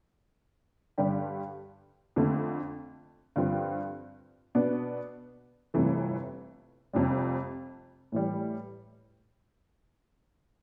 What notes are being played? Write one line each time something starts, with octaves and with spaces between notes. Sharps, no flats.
G2 D3 G3 D4 G4
F2 D3 A3
G2 D3 F3 C4
B2 B3 D4
G1 F2 C3 E3 A3
F1 F2 C3 G3
A2 E3 G3